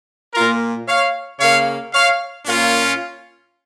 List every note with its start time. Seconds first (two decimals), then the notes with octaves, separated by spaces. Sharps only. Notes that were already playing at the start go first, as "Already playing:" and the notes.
0.34 A#2 A#3 F4 A#4
0.87 C#5 F5
1.40 C#3 A#3 C#5 F5
1.92 C#5 F5
2.45 A#2 A#3 C#4 F4